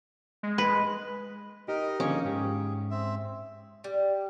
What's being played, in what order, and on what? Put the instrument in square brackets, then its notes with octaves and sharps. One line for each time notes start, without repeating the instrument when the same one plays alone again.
[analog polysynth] G#3
[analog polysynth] G#3 [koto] B4
[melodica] D#4 A#4 D#5 [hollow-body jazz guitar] G4
[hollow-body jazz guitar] D3 F3 [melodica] A#3 D#4 G#4 [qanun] C#4
[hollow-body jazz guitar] G#2 G4 [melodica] G#4
[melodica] C4 E5
[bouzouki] G3